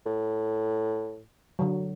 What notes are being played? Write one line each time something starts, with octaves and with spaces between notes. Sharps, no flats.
A2
D3 F#3